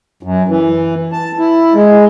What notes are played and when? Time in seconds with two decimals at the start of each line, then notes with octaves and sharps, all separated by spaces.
0.23 F#2
0.49 E3
1.12 A5
1.39 E4
1.74 G#3